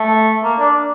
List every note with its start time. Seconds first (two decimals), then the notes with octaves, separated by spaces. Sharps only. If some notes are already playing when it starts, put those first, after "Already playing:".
Already playing: A3
0.44 A#3
0.59 D4